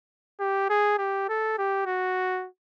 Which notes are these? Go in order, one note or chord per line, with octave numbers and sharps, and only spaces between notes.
G4
G#4
G4
A4
G4
F#4